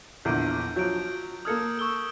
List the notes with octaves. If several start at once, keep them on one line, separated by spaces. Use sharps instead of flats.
A#1 E2 D3 G6 D7
F3 F#3 G6 D7
A#3 A4 D#6 F6 G#6 C#7
C#6 E6 G7